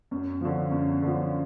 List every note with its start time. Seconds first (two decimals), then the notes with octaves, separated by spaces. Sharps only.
0.11 F#2
0.41 D3 F3
0.71 F#2
1.02 D3 F3